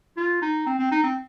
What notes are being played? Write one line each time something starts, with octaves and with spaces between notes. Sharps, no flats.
F4
D#4
C4
C4
D#4
C4